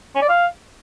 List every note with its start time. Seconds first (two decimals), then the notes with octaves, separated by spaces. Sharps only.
0.15 C#4
0.22 D5
0.29 F5